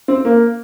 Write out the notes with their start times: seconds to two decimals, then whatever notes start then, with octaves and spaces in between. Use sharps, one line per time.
0.08 C4
0.25 A#3